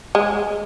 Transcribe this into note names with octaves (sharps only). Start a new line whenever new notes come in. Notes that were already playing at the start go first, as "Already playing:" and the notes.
G#3